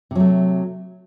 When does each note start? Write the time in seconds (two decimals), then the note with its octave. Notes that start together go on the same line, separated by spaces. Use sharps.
0.11 C3
0.15 F#3
0.20 A3